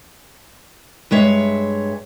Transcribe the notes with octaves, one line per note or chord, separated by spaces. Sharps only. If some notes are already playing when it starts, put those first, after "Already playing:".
G2 G#3 C#5 E5